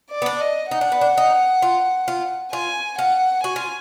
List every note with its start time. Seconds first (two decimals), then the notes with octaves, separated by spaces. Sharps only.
0.11 D5
0.22 B3
0.26 D4
0.41 D#5
0.71 D#4 F#5
0.81 D4
0.92 B3
1.01 D4
1.17 D#4
1.62 F4
2.08 F4
2.53 F4 G#5
2.99 F4 F#5
3.44 F#4 G#5
3.56 F4